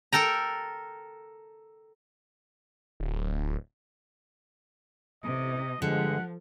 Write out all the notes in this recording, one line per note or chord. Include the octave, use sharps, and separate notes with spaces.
A4 A#4 G5 A#5
D1
A1 C3 D#5
G2 D3 F3 G#3 F#5